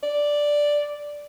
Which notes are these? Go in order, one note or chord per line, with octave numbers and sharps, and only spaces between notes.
D5